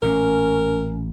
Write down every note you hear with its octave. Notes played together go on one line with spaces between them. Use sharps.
A1 A#2 C#4 A#4